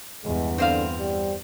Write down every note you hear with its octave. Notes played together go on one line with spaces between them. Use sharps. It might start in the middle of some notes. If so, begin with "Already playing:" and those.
E2 G2 G#3
D3 C4 C5 F5
G3